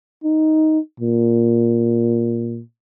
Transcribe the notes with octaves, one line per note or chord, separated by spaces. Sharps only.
D#4
A#2